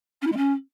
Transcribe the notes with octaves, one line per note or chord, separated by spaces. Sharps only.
C#4
E4
G#3
C#4